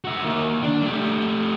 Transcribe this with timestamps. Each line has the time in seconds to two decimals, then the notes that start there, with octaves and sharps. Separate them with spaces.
0.05 F#4 E5
0.24 D#3 A#3
0.63 D4
0.83 A3 G4